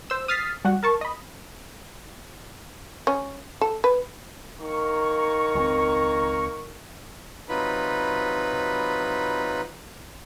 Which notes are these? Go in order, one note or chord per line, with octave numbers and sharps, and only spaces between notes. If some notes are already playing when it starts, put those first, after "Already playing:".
C5 E6
D#6 F6 A6 B6 C7
G3 F#4 F#5
A#4 A5 C#6
D#5 B5
C#4
A4
B4
D#3 A#3 A#5 C#6
C#2 F3 C4
C3 F#3 D#4 F4 B4 B5